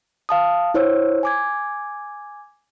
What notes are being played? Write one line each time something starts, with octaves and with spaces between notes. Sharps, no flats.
F5 A5 D#6
E4 C5 C#5 E6
G#5 D6 G#6